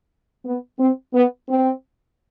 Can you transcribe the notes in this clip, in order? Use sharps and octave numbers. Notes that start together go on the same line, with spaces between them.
B3
C4
B3
C4